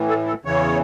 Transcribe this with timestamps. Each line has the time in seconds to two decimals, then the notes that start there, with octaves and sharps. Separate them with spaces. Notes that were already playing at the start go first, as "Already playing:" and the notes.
Already playing: A2 E3
0.08 A4
0.27 A4
0.45 E2 C#3 E3 C#5